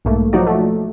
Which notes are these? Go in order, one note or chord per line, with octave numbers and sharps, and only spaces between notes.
B1 G#2 A3 A#3
F3 F#3 D#4 F#4 D5
A3